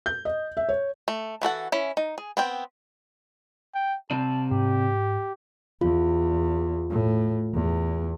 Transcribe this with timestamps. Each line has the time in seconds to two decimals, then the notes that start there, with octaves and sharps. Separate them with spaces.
0.06 G6
0.25 D#5
0.57 E5
0.69 C#5
1.08 A3
1.42 E3 F#4 A4 F#5
1.72 C#4 E4
1.97 D#4
2.18 G#4
2.37 B3 C4 G5
3.75 G5
4.11 C3 C4 D5 A5
4.51 G#2 G4
5.81 E2 F4
6.90 A2
7.54 E2